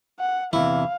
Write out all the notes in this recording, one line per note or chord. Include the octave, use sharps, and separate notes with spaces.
F#5
E2 C3 E3 E4 F5